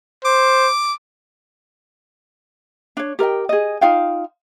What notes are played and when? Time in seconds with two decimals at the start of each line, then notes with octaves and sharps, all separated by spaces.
0.25 C5 D6
2.97 D4 C#5
3.19 G4 A#4 D#5 G5
3.49 G#4 D#5
3.81 D#4 F4 F5 G5